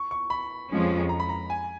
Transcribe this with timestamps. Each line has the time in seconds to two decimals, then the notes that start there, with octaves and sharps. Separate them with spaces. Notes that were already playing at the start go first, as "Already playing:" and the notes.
Already playing: C#6
0.11 C#6
0.30 B5
0.70 F2 F3 G#3 C#4
1.09 A#5
1.20 B5
1.29 A#5
1.50 G#5